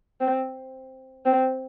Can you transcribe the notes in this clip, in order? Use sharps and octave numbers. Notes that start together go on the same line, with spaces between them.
C4
C4